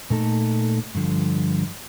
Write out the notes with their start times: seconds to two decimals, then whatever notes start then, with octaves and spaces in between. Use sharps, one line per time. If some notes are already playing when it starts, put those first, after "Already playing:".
0.10 A#2 A3 D#4 A4
0.95 G2 D3 F3